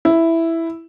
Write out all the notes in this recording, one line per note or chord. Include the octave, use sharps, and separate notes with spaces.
E4